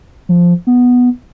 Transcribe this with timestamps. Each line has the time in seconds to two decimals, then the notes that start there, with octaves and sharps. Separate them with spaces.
0.29 F3
0.67 B3